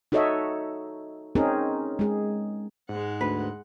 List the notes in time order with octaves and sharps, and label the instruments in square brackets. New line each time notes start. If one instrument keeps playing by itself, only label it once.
[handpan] D#4 F#4 A4 C#5 D#5 E5
C4 C#4 D#4 G#4 A#4
G#3 G#4
[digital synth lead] G#2 [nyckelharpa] G#3 F#5
[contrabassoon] D2 [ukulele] B4